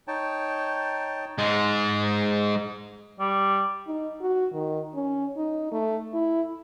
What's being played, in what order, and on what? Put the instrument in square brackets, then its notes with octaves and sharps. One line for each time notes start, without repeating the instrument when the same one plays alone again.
[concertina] D#4 C#5 G5 A5
[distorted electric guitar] G#2 G#3
[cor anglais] G3
[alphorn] D#4
F#4
D#3
C#4
D#4
A3
E4